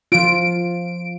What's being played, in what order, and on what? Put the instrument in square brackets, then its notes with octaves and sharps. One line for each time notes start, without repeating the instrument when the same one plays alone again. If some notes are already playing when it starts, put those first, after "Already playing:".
[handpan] F3 F4 [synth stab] D7